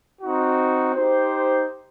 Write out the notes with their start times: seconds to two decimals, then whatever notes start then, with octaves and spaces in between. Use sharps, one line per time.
0.21 C4 D#4 F#4
0.94 D#4 G4 C5